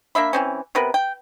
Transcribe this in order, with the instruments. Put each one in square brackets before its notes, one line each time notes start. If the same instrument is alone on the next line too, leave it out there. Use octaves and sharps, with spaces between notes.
[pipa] A#3 D4 E5 B5
E3 C4 C#4
C3 B3 A#4 B4
G5